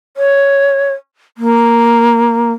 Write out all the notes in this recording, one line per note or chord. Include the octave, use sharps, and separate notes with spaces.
C#5
A#3